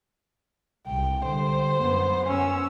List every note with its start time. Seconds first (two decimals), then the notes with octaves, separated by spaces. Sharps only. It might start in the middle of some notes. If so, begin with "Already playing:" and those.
0.88 C2 G5
1.25 D3 G3 C5
1.80 F#2 B3
2.27 C#4 E6